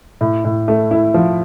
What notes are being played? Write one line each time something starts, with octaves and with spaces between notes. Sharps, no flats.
A2
A2
A3
E4
F3